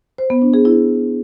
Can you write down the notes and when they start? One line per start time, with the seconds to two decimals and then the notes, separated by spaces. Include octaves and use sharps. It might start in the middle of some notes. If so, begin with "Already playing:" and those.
0.18 C5
0.30 B3
0.42 D4
0.54 G#4
0.65 E4